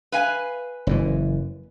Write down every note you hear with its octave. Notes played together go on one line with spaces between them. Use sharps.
B4 F5 G#5
F#1 F#2 E3